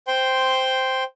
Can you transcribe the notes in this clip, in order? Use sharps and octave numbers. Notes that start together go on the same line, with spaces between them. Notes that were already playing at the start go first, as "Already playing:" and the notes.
C5 G5 C6